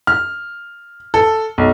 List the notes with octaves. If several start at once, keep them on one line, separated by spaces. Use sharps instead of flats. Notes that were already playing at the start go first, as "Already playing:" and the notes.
F6
A4
B1